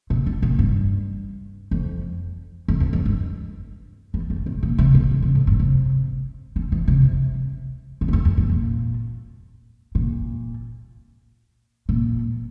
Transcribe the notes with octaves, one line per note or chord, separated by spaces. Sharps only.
A#2
D3
A#2
G2
F2
F2
E2
F2
G2
E2
F2
A2
A#2
C3
A2
D3
C3
A2
G2
C3
D3
E3
C3
C3
A#2
G2
F2
F2
A2
A#2
A#2
A#2